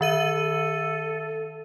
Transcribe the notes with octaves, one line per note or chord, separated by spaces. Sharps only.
D#3 A4 E5 D#7